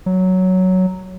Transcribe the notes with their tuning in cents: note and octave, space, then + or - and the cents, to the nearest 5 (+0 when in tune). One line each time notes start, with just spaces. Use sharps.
F#3 +5